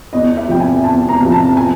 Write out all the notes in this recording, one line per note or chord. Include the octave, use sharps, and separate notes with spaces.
E2 D#5
E5
C3 F3 G5
G#5
E2 A5
A#5
C3 F3
A5
G#5